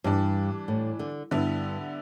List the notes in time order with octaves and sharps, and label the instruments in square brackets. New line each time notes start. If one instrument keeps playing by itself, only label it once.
[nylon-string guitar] G2 [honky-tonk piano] E3 G3 D4
[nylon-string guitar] A2
D3
[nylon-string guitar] G2 [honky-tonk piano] D3 B3 E4